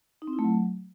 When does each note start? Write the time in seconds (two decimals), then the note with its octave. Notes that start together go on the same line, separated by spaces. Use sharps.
0.22 D#4
0.27 C4
0.33 E4
0.39 A3
0.44 F#3